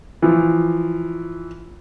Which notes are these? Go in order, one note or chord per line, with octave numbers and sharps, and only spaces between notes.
E3 F3